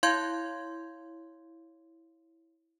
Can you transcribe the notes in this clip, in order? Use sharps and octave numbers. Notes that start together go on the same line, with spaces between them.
E4 C#5 F5 C6 G6 G#6